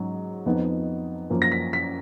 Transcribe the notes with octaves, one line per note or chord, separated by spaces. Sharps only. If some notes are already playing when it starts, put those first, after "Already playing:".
Already playing: G#2 F#3 C#4
F2 F3 B3 D#4
F#2 F3 A#3
A#6
B6
B6